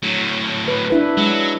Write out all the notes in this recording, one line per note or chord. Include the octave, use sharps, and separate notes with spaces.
A2 F#3
B4
D4 E4 B4
F#3 G#3